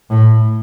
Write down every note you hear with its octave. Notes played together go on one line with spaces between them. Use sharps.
A2